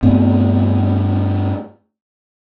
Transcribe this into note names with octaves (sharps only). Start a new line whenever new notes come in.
G2 A3 B3 C4